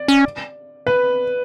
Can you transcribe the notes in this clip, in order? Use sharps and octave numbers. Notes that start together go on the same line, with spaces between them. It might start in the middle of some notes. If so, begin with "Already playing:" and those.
Already playing: D5
C#4
B4